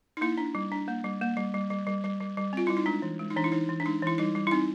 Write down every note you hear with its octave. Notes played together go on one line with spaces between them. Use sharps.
D#4
A#3 E4
D4
G3
D4
A#3
G3
A#3
G3
G3
G3
G3
G3
G3
G3
C4 F4
G3 E4
D#4
G#3 D4
E3
G#3
D#4
E3 D4
E4
E3 D#4
E3
D4
G#3 D#4
E3 E4
G3 D#4
G3
E4
C4 D#4